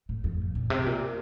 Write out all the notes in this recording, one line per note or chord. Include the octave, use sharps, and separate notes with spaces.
A2
F2
A#2
C3
A#2